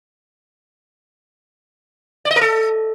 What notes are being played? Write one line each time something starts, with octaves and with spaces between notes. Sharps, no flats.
D5
D#5
A#4
A4